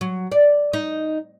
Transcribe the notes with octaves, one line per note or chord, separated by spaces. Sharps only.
F#3
D5
D#4